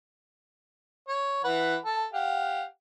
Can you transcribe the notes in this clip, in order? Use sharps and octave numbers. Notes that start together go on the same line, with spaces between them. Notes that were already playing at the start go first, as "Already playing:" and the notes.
C#5
E3 B4 F#5
A4 A5
G4 F5 F#5